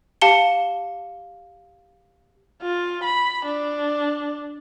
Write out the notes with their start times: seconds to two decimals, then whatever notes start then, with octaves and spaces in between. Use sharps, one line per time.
0.22 G4 F5 A5 C#7 G7
2.62 F4
3.04 B5
3.46 D4